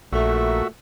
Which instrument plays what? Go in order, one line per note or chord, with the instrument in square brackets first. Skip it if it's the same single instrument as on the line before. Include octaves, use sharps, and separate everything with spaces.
[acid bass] A#1 [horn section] A#2 A3 [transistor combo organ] F#4 E5